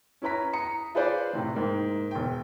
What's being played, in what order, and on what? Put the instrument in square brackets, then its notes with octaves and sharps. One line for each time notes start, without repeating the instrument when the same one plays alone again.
[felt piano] C#4 E4 B4 A#5 B6
A#5 D#6 C#7
F4 G#4 B4 C5 D5
A2 C3 E3
G#2 A#3
E1 G5